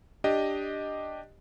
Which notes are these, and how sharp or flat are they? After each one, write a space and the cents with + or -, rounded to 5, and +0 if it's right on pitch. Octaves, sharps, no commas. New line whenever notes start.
D4 +0 G4 +0 D#5 +0